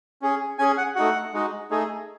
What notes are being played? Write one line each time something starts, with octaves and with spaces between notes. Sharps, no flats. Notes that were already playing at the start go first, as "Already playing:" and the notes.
C#4 G#4
C#4 G#4 G#5
F#5
A3 D#4 F#4 F#5
G#3 D#4 F#4
A3 D#4 G#4